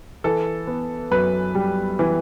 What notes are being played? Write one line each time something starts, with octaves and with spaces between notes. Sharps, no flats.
E3 A4
B3
F#2 B4
G3
E3